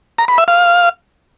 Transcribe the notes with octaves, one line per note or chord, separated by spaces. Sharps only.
A#5
B5
E5
F5